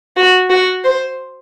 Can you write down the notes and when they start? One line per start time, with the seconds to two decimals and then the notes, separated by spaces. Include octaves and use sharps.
0.17 F#4
0.50 F#4
0.84 C5